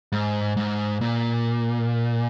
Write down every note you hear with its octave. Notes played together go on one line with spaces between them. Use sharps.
G#2
G#2
A#2